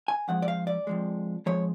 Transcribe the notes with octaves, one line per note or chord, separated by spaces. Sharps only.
G#5
F2 F3 G#3 F#5
D5
F5
D5
F2 F3 G#3
F2 F3 G#3 C#5